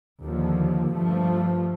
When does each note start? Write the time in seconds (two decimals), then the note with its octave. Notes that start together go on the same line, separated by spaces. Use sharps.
0.22 D#2 D3 F3
0.93 G2 F3 A3